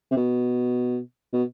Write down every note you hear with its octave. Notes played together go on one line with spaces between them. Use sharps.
C3
B2
B2